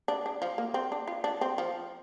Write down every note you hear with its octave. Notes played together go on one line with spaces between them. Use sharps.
D4
D4
F3
A#3
C4
D4
F4
D4
C4
F3